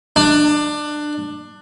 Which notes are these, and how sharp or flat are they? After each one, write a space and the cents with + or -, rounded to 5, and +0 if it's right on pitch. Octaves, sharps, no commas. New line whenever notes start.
D4 +20